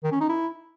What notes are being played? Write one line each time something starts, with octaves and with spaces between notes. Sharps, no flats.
D#3
C#4
D#4
E4